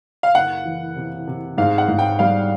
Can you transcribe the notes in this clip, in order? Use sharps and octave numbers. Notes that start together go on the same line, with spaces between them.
F5
F#1 F#5
E3
C3
C3
G#2 F5
F#5
G#2
G5
G3 F5